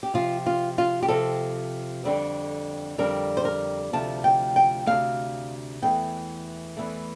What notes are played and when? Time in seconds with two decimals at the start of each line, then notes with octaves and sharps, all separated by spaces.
0.03 G4
0.14 C3 F3 C4 F4
0.46 F4
0.78 F4
1.03 G4
1.08 C3 F3 C4 A4
2.04 F2 D3 G3 C4
2.98 F2 D3 G3 C4 A#4
3.37 C5
3.45 A#4
3.93 D2 C3 F3 A3 A5
4.24 G5
4.56 G5
4.87 D2 C3 F3 A3 F5
5.82 E2 E3 A3 G5
6.77 E2 E3 A3